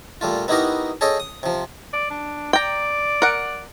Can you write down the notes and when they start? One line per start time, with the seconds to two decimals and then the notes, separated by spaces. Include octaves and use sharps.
0.21 A#2 G3 A3 F4
0.48 B3 D#4 E4 F#4 G4 A#4
1.01 G#4 A4 C#5 D#5 G5
1.20 D#6
1.43 C3 F3
1.93 D5
2.11 D4
2.53 D5 G5 A#5
3.22 A#4 F#5